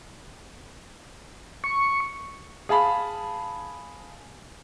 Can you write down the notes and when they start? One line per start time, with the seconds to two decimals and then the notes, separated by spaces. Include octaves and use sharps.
1.64 C#6
2.69 G#4 F5 A5 B5